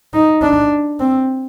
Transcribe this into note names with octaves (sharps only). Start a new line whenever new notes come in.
D#4
D4
C4